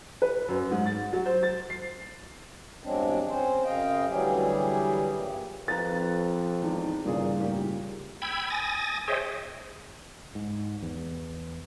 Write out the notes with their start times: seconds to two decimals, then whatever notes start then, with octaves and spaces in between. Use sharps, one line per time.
0.22 B4
0.48 F#2
0.71 G#2
0.86 A6
1.13 F#3
1.26 C5
1.43 A6
1.70 C7
2.84 E2 G2 F#3 G#3 C4 D4
3.29 C4 C#4 C5
3.65 F#2 C#3 D#5 F5 G5
4.09 D2 E3 F#3 G3 G4 G#4
5.11 G2 A#2
5.68 F2 B4 F5 A#5 A6
6.62 E2 G#2 D#3
7.05 G2 A#2 C#3 E3 G#4 D5
7.39 A2 A#3 G4
8.22 G5 B5 E6 G#6
8.50 G#5 D#6 A6 A#6
9.08 G#4 C5 C#5 D#5 E5 G5
10.35 G#2
10.82 E2